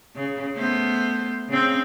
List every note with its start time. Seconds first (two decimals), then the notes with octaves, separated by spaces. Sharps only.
0.16 C#3
0.55 A3 B3 C5
1.49 C#3 C4